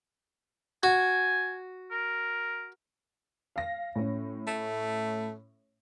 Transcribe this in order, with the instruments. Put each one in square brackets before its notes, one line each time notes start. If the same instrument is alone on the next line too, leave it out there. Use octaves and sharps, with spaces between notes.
[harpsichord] F#4 [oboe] G#5
[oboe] A#4
[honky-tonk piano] F5 A#6
A2 C#4
[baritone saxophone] A3